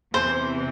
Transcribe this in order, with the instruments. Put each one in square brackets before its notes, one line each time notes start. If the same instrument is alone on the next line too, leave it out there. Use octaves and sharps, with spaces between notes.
[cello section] E2 C3 E3 [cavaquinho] C5